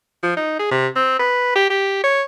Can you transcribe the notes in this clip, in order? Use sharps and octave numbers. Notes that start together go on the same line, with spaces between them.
F3
D#4
G#4
C3
C4
B4
G4
G4
C#5